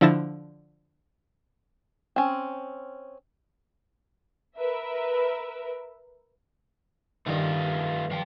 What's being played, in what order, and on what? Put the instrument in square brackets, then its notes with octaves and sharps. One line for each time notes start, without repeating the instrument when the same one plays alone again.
[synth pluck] D3 F3 E4 A6 A#6 E7
[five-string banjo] C4 C#4
[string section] A#4 B4 E5
[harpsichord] G2 D#3 [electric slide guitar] A3 F4 D#5
[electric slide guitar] F3 F5 G5